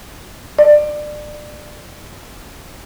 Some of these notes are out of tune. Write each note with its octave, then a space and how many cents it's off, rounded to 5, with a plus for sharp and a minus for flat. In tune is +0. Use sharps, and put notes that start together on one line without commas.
D5 +25